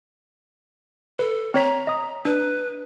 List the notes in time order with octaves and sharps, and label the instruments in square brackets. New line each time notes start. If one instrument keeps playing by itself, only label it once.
[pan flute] A4 [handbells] B4
[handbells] C4 C#5 B6 [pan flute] A#5
[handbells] D#5 D#6
[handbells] D4 [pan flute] B4